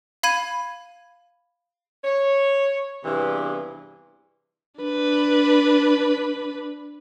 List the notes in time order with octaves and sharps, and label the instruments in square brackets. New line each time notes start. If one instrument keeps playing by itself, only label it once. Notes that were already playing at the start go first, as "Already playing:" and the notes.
[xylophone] F5 B5 G#6 D#7
[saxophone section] C#5
E2 G2 C3 E3
[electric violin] D4 B4